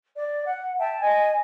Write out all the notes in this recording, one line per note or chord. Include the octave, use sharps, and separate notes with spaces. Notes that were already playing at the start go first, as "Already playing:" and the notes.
D5
F#5
E5 G5 A5
D#5 G#5